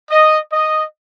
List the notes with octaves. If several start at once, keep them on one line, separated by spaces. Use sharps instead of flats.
D#5
D#5